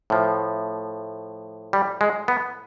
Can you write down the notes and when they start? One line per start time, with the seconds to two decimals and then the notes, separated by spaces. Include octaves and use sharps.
0.10 A2 F3
1.73 G3
2.01 G#3
2.28 B3